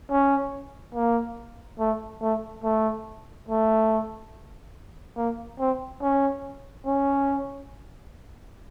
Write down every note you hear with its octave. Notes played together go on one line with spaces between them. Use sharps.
C#4
A#3
A3
A3
A3
A3
A#3
C4
C#4
C#4